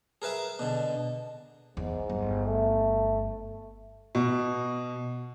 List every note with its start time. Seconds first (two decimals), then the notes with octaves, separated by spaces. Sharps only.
0.22 G#4 A#4 B4 E5
0.59 B2 D3
1.77 E2 G#2
2.09 G1
2.46 A3
4.15 B2